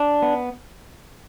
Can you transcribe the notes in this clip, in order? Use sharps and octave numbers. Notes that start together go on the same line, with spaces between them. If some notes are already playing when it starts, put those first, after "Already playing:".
Already playing: D4
B3